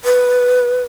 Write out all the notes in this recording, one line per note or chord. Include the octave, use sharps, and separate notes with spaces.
B4